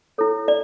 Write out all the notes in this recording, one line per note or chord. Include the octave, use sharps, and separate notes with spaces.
E4 A4 C#5
D5